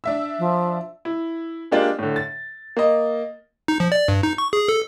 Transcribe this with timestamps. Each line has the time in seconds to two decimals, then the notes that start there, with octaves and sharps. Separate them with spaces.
0.04 D4 E5 E6
0.39 F3
1.05 E4
1.71 G#3 A#3 D4 F4 G4 D5
1.99 A2 D3
2.16 A6
2.77 A#3 D#5
3.68 D#4
3.80 F3
3.92 D5
4.08 G2
4.23 D#4
4.38 C#6
4.53 G#4
4.68 A4